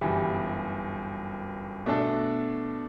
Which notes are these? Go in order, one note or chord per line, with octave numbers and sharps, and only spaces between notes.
G1 F#2 E3 G3
B2 A3 D4 A4